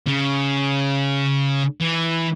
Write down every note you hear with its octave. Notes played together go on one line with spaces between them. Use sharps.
C#3
E3